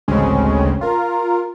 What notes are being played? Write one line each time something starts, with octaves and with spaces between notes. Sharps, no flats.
A1 D2 C#3 G#3 C4 C#4
F4 A#4